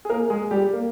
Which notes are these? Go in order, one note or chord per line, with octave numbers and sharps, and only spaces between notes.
G#4
A#3 A#4
G#3 G#4
G3 G4
A#3